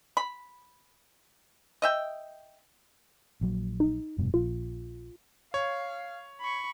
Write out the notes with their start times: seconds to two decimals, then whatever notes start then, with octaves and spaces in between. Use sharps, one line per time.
0.17 B5
1.82 D#5 E5 G5
3.41 A#1 F#3
3.80 D#4
4.18 F1 G2 B2
4.34 A#1 F4
5.54 C#5 F5
6.41 B5 C#6